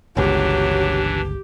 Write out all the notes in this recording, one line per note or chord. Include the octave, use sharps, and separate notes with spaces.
G1 C#2 E3 F#3 D4 G4